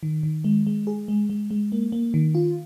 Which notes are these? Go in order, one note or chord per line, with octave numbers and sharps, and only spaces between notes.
D#3
D#3
G#3
G#3
G#4
G#3
G#3
G#3
A#3
A#3
D#3
F4